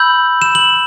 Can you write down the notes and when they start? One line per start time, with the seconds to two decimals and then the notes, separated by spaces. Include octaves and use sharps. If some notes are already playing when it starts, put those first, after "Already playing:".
Already playing: B5 E6 G6 F#7
0.42 E7
0.55 F#7